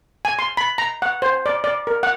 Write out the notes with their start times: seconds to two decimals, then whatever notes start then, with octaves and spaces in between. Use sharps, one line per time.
0.25 G#5
0.39 C6
0.57 B5
0.78 A#5
1.02 F#5
1.22 C5
1.46 D5
1.64 D5
1.87 A#4
2.03 F#5